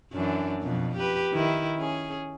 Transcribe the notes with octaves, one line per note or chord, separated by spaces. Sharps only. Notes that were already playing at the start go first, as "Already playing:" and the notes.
F#2 E3 D4
F2 B2
G4 B4
D#3 E4
C#4 G#4